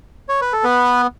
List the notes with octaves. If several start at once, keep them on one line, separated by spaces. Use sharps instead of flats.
C#5
B4
A4
B3 B4